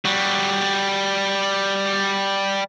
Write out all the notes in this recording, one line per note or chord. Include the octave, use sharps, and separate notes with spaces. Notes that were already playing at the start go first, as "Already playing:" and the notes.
G3 F#4